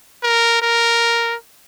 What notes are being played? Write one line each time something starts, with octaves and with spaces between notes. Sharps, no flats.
A#4
A#4